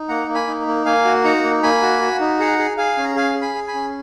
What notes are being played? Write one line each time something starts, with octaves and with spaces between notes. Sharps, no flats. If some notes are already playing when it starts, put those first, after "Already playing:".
Already playing: D#4
A#3 F#5 A#5
A#3
G#5 B5
D#4
A#3
A#3 F5 G#5
F#4
D#4 F#5 A#5
A#3
A#3 G#5 B5
F#4
F#4
D#4
G#4 F#5 A#5
G#4
G#4 F5 G#5
C#4
A#5
G#4 F5 G#5
G#4
G#5 B5
G#4
G#5 B5
C#4